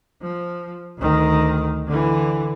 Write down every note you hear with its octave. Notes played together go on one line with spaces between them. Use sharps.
F3
D2 D#3
D3 E3